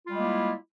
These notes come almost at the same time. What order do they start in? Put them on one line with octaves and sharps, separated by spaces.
F4 G3 G#3 A#3 E4